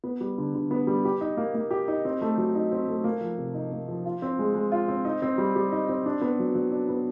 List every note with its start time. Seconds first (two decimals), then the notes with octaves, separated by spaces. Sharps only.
0.04 B3
0.20 G3
0.38 D3
0.55 D3
0.71 B3
0.87 G3
1.05 G4
1.21 D#4
1.37 A#3
1.55 A#3
1.71 G4
1.88 D#4
2.05 C4
2.21 A3
2.37 F#3
2.55 D#4
2.72 C4
2.88 A3
3.04 A#3
3.21 F3
3.38 C3
3.55 D#4
3.72 A#3
3.88 F3
4.05 F4
4.22 C4
4.39 G#3
4.55 G#3
4.72 F4
4.88 C4
5.05 D#4
5.22 C4
5.38 G3
5.56 G3
5.72 D#4
5.88 C4
6.06 D4
6.21 B3
6.39 F#3
6.55 F#3
6.72 D4
6.89 B3